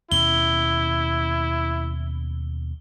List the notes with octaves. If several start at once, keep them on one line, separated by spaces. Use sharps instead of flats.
D#2 B2 C#4 E4 G7